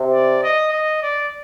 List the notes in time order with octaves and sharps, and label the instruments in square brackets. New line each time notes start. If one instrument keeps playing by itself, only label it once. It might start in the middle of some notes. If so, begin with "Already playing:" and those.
Already playing: [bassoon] C3
[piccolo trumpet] D5
D#5
D#5
D5